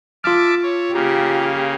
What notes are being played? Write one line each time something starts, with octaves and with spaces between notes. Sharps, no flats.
F4 E5 A5 D6 F6
C#5
C#3 A#3 G4